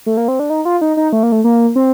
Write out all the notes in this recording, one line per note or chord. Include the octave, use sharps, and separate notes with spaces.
A3
A#3
C4
D4
D#4
F4
D#4
D#4
A3
A#3
A3
A#3
C4